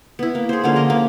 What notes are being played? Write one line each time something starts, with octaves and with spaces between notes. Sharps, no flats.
B3 E4
A#3
G#4 C5
D3 F3 A#3 C#4
A#4 D#5
A#3